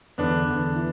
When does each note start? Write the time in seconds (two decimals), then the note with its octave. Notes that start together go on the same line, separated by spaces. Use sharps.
0.18 E2 D3 B3 D4
0.47 E2 D3
0.76 E3